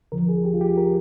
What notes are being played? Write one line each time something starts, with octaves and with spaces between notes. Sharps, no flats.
D#2 D3 F3 A#4
G#4
G4
F4
G4
A#4